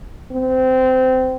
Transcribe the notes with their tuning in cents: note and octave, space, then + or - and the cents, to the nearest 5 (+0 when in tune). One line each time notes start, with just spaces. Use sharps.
C4 -20